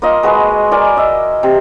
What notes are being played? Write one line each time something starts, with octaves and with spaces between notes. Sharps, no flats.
A#3 F4 D#5
G#3 F#4 B4
A#4 D5 G#5
D#5 E5
C3